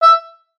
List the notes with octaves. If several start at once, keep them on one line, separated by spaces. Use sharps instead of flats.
E5